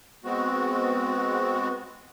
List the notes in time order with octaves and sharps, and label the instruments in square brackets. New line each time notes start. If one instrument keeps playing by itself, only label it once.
[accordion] G#3 B3 C4 F#4